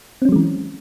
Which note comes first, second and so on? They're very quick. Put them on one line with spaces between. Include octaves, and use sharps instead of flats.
C4 C#4 F#3 G#3 E3